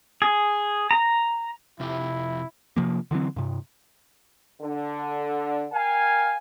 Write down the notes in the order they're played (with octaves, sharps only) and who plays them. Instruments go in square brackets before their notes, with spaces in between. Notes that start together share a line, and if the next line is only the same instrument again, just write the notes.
[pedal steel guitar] G#4
A#5
[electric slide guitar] F2 C3 G4 [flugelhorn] E4
[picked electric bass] C3 F3 A#3
D3 E3 F#3 C4
G2 C3
[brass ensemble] D3
A#4 F5 G5 G#5